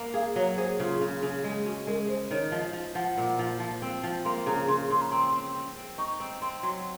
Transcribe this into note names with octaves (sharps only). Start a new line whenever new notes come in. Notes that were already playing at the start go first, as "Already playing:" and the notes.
Already playing: A#3
G#4 F5
F#3 C#5
G#4 C5
C#3 F4
C#3
C#3
G#3
C#4 F#4
G#3 A#4
G#3 C5
D#3 C#5
F3 D#5
F3
F3 F#5
A#2
F3
F3
C4
F3
A#3 C6
C#3 A#5
C#3 C6
C#3 C6
A#5
C4 C6
C4
C4
C4
D#4 C#6
C4
C4 C6
F#3 C6